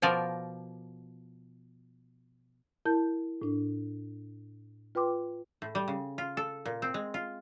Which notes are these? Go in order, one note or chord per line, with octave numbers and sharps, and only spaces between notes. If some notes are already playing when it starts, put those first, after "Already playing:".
B2 F3 A#4 D5
E4 A#4 A5 G6
A2 D4
F4 B4 G5 C6 D6
A2
G3
C#3
F4
A4
A#2
C4
G#3
F4